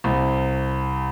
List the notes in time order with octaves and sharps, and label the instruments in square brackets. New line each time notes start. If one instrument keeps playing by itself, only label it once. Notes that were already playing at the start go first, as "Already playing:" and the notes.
[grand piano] C2